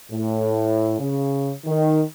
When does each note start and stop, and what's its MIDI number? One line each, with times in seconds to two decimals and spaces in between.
0.12 0.98 45
0.99 1.52 49
1.64 2.01 51